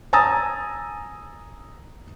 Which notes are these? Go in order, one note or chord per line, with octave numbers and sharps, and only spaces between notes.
G#5 A#5 D#6 E6 A6